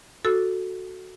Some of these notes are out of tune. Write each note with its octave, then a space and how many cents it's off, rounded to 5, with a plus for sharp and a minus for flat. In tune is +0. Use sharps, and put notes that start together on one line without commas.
F#4 +0 A4 +0 E6 +0